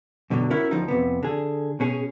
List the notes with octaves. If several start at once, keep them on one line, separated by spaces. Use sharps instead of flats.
F#2 B2 D3 F3 F#3
C#4 E4 F#4 A#4
D2 F3 D#4
F2 C3 B3
D3 G#4
B2 C#4 G#4